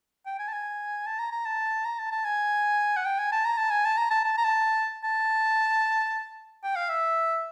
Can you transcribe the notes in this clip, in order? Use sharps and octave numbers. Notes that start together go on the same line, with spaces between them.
G5
G#5
A5
G#5
A5
A#5
A#5
A5
A#5
A5
A5
G#5
F#5
G5
G#5
A5
A#5
A5
G#5
A5
A#5
A5
A5
A#5
A5
A5
G5
F5
E5